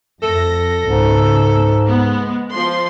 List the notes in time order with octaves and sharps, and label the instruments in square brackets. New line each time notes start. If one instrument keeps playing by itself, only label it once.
[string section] F2 A#6 [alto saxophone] A4
[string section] C#2 B2 [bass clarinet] G#2
[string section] G#3 [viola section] B3
[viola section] F3 C6